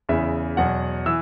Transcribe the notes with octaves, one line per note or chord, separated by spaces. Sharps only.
E2 C#3 E3 E5
E2 B2 F#3 F#5
E3 E6